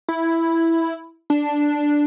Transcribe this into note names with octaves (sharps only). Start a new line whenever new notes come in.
E4
D4